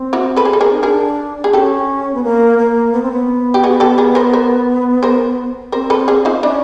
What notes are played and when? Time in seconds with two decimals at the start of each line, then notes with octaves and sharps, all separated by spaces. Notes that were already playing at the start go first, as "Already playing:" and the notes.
Already playing: C4
0.13 E4 F#4
0.36 A4 B4
0.45 G#4
0.53 A4
0.61 G#4 A#4
0.71 D#4
0.83 D4 G#4 A#4
1.44 G#4
1.53 C#4 G4 A4
2.14 B3
2.24 A#3
2.58 A#3
2.93 B3
3.02 C4
3.12 B3
3.54 G4
3.64 F#4 G#4
3.80 G4 A4
3.98 G#4 A#4
4.15 A#4 C5
4.33 A#4 C5
5.03 A#4 C5
5.72 C4 A#4 C5
5.90 A4 B4
6.08 G#4 A#4
6.25 D#4 F4
6.43 C#4 D4 E4